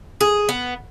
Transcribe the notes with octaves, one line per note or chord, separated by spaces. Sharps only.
G#4
B3